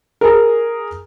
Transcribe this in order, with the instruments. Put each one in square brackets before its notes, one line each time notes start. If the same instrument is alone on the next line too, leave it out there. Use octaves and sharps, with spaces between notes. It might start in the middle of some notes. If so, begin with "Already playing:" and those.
[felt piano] G#4 A#4